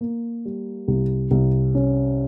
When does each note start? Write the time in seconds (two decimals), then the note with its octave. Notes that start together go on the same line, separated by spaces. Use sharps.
0.01 A#3
0.45 G3
0.88 C2
1.31 C2
1.75 C#4